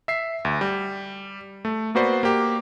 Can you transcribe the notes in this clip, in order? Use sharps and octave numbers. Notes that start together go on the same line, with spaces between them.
E5 C7
D2
G3
A3
A#3 B3 F#4 B4 C5 D5
A#3 G4